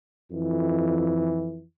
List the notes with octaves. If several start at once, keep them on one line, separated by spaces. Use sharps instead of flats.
F2 E3